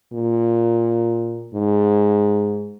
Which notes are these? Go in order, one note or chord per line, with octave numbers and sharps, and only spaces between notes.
A#2
G#2